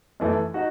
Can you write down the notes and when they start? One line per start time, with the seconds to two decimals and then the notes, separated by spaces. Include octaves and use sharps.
0.20 F#2 E3 A3
0.54 D#4 F#4